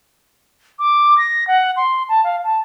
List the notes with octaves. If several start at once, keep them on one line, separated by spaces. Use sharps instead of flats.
D6
A#6
F#5
C6
A5
F5
A5